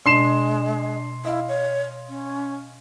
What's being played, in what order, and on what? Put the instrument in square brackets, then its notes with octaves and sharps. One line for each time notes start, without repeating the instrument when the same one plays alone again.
[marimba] B2 [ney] G#3 [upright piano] D4 [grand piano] C6 C7 E7
[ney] E4 [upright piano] D#5 F5
[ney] C#5
C#4